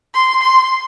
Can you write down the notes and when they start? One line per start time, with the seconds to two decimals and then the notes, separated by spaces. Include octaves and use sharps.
0.14 C6
0.42 C6